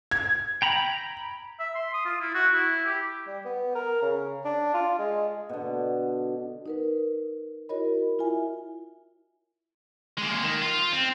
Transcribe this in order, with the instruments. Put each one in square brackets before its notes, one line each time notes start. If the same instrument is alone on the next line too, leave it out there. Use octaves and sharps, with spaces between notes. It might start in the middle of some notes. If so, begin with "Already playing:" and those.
[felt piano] G#6
[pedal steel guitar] G5 A#5 B5
[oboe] E5
C6
D#6
F4
E4
F#4
E4
G4
[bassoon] G3
B3
A#4
C#3
D4
F4
G#3
[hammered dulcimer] B2 D3
[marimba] D#4 A#4 B4
E4 F#4 A#4 C#5 D#5 B5
E4 F4 E5 G#5
[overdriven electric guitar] G#3 A#3
D#3
F4
C4